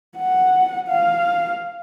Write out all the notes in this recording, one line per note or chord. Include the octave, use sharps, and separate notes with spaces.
F#5
F5